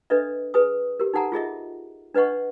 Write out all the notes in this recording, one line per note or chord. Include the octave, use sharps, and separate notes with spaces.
D4 A4 B4 D#5 E5
G#4 B4 G#5 D#6
G4 A#4
D#4 G4 A4 F#5 G#5 A#5
F4 G#4 D#5 E5
D4 B4 D#5 F#5 C#6